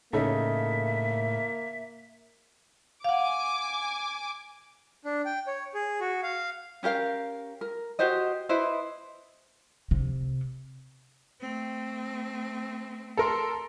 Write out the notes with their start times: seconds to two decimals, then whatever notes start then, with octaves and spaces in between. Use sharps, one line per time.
0.13 A2 C#3 A#3 D#4 A4 E5
3.04 F5 F#5 G#5 D6
5.05 D4
5.25 G5
5.47 C#5
5.74 G#4
6.00 F#4
6.23 F5
6.83 C#4 G4 A#4 F5
7.61 A#4
7.99 F#4 G4 C5 D#5
8.49 E4 B4 C5 D#5
9.91 C3
11.41 A3 C4
13.17 A4 A#4 A#5 C6